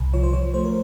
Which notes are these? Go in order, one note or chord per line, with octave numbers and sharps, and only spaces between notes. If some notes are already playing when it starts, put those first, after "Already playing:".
Already playing: C2
F3 C#5
C5
F3 C#5
A3 C5
A#4